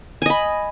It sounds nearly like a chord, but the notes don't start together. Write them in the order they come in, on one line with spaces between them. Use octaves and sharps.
G#5 D#5 B5